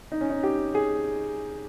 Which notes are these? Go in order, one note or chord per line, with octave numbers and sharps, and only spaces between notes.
D#4
C#4
D#4
G4
G#4